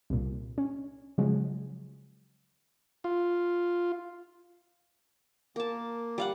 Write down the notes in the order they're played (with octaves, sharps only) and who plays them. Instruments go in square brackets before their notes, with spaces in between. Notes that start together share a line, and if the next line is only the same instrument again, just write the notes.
[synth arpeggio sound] C2 A#2
C#4
C#3 F3 F#3 G#3
[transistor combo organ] F4
[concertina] A#3 [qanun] A#4 A5
[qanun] G3 F5 F#5